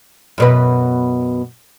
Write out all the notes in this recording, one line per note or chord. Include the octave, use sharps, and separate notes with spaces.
F#2 B2 B4